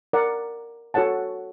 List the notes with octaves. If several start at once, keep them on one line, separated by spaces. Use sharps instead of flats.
A#4 D5 F#5
F#4 A4 C#5 F#5 A5